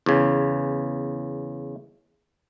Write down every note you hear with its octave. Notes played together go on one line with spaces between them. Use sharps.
E2 C#3